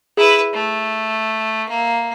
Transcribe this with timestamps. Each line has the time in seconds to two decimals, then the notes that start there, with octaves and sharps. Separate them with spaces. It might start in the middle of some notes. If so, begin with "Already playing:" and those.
0.17 E4 G#4 B4
0.54 A3
1.69 A#3